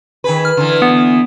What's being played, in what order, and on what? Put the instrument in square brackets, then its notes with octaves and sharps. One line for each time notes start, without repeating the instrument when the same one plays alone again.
[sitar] D#3 G#4 B4
[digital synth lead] F6
[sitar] D3 E3
[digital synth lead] B3